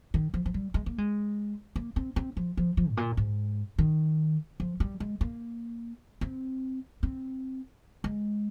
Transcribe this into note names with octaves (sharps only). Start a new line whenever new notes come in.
D#3
F3
F3
G3
G#3
A#3
G#3
A#3
C4
C4
F3
F3
F3
G#2
A#2
G#2
D#3
F3
G3
G#3
A#3
C4
C4
G#3